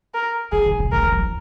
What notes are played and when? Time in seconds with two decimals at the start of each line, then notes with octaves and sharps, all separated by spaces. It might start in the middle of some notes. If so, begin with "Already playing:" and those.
0.14 A#4
0.52 D#3 G#4
0.66 D3
0.80 C3
0.92 D3 A#4
1.02 D#3
1.12 F3
1.22 F3